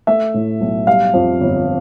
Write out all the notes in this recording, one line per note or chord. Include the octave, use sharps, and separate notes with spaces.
A3 E5
A2
B1
G3 F5
F2
G1